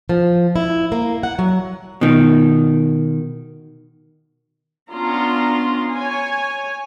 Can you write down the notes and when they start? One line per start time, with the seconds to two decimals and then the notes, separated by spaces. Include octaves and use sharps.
0.09 F3
0.56 E4
0.92 A#3
1.23 F#5
1.39 F#3
2.01 B2 D#3
4.92 B3 C#4 D4 F4 A#5 C6
5.92 C#5 G#5